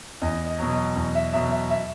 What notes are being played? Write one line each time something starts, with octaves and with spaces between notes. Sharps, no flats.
E2 D#5
D#5
B2 F#3
D#5
E2
E5
B2 F#3 E5
E5
E5